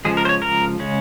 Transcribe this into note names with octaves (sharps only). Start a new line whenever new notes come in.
C#3 F3 G#3 G#4
A#4
C5
C#5
A#4
C#3 G#3 C#4